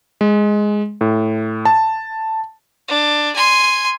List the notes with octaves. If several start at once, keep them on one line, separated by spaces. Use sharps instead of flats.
G#3
A2
A5
D4
G#5 C6